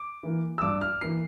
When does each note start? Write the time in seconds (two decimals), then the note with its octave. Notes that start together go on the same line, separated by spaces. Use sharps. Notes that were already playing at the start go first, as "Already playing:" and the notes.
Already playing: D6
0.23 E3 A#3
0.58 E6
0.62 G2 D6
0.81 F6
1.01 E3 A#3 C7